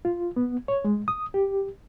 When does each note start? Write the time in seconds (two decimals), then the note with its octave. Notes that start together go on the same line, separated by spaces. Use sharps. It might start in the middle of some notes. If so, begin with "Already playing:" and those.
0.05 F4
0.36 B3
0.68 C#5
0.85 G#3
1.08 D#6
1.34 G4